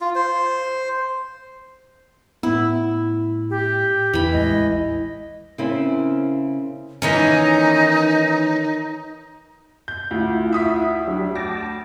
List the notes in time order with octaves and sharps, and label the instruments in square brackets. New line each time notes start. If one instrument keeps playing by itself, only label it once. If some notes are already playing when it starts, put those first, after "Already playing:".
[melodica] F4
C5
[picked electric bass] A2 B3 [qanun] E4
[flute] G4
[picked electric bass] E2 [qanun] E3 B5
[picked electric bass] A1 D#2 G#3 [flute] D#5
[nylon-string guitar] C#3 C4 C#4 E4 A#4
[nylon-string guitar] D#3 [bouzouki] E3 A#3 C#4 [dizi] D#4
[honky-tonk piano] G6
[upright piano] D2 [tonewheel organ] E4 F4
[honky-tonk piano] E5 D#6 B6
[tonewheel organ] F#3 D4 G4
[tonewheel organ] G5 A5 D6 [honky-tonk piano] A#6